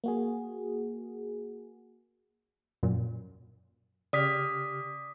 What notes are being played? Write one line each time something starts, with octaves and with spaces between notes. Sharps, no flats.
A#3 F#4 G#4
F#2 A#2 F#3
C#3 G4 D5 D#6 F6 B6